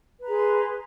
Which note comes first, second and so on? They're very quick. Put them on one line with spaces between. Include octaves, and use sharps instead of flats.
B4 A#5 G#4 C6